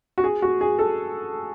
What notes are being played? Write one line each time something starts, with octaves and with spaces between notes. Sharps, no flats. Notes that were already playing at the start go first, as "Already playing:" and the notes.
F#4
G#4
F#4
G#4
A4